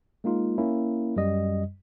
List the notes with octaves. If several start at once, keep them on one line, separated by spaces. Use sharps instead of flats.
G#3 A#3 D#4 F4
A#3 C#4 E4
F#2 G3 D#5